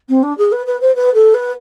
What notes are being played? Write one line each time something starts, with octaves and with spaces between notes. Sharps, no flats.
C4
D4
G#4
B4
B4
C5
B4
A4
B4